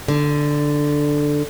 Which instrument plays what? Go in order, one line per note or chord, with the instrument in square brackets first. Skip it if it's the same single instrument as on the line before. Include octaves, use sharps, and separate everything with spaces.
[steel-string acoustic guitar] D3